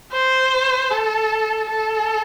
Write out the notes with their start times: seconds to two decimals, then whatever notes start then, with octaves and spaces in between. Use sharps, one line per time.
0.13 C5
0.91 A4
1.69 A4